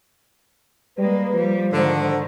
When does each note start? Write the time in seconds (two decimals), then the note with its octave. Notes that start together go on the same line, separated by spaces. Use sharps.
0.98 G3 G#3 A#3 B4
1.34 F3 G3
1.73 G#2 D3 D#3 A4 C5